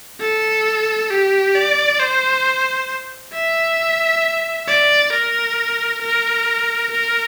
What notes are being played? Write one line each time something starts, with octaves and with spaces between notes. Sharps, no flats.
A4
G4
D5
C5
E5
D5
A#4
A#4
A#4